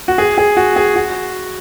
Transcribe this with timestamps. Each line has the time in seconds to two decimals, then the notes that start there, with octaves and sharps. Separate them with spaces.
0.08 F#4
0.18 G#4
0.38 G#4
0.57 F#4
0.76 G#4
0.96 F#4